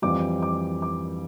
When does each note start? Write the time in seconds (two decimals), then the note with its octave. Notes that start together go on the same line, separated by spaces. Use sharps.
0.02 F2 E3 G3 D6
0.42 D6
0.82 D6